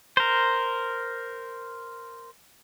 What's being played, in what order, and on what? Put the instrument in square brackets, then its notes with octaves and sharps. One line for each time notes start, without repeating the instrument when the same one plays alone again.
[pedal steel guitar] A#4 C5